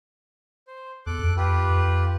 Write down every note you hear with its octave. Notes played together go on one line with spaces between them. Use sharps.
C5
E2 A4 D6 F#6
F2
F4 G4 B4
F2